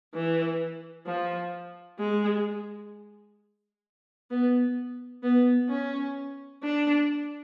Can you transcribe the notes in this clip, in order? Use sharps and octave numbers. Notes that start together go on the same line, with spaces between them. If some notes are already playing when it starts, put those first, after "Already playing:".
E3
F3
G#3
B3
B3
C#4
D4